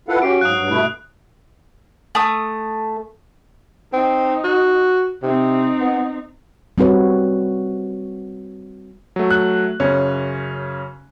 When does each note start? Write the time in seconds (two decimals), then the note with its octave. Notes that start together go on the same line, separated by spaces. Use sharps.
0.09 E4 F4 A4 B4 F5 F#5
0.22 C#4 F#4 G4 C7 D7
0.41 G#2 F#3 F5 D#6 F#6
0.54 G2
0.70 B2 A3 E4
2.15 A3 D#6
3.93 C4 D#4
4.44 F#4
5.23 C3 C4 D#4
5.80 B3
6.78 G3 C4 F#4 B4 C#5
9.16 F#3 A3
9.31 F#6
9.80 F#2 C#3 C#4